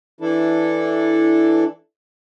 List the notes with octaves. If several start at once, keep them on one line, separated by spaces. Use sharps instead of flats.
E3 D4 E4 A4